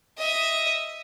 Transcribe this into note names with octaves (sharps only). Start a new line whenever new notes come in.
D#5 E5